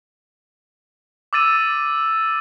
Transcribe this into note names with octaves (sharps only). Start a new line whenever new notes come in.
D6 E6 A6 D#7